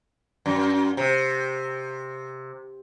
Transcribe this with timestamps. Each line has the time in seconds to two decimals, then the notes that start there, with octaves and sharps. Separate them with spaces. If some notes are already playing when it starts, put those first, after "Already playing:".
0.46 F#2
0.97 C3